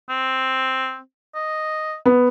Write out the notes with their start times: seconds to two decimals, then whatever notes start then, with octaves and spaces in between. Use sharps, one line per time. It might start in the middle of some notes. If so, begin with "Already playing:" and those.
0.09 C4
1.35 D#5
2.06 B3